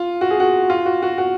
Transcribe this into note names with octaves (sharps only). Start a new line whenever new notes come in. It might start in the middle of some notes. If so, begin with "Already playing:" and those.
Already playing: F4
F#4
G#4
F#4
F4
F#4
F#4
F#4